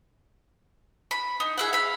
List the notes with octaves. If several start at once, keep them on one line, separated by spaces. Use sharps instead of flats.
B5
D#4
G#4 E5 F#5
F5 B5